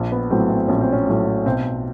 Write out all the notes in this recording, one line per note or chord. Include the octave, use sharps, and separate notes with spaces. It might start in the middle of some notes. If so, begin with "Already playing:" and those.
Already playing: A#1
B3
A2 F#3 A3 C4
C4
A#1 C#4
C4
C#4
A2 F#3 A3
B1 C4